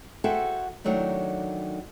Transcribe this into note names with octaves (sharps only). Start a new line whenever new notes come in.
F#4 G#4 A4 C5 E5 G5
D#3 F#3 A3 D4 D#4